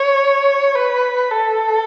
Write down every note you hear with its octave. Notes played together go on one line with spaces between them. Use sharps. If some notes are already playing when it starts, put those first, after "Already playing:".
Already playing: C#5
B4
A4